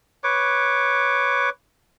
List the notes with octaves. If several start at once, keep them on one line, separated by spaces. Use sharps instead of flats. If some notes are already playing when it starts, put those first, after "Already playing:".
B4 C#5 D6